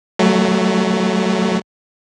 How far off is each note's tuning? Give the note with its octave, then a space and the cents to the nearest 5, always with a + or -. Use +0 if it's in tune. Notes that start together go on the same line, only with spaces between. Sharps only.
F#3 +20 A3 +0